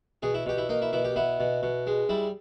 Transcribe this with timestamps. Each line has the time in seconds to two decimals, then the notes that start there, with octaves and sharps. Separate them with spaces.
0.22 B2 G#4
0.34 E4
0.46 B2 G4
0.58 E4
0.69 A#3 D#4
0.82 E4
0.93 B2 E4
1.04 G4
1.16 B3 E4
1.40 B2
1.63 B2
1.87 G#3
2.09 G3 E4